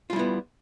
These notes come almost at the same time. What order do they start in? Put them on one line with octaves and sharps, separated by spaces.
F4 G3 E4 B3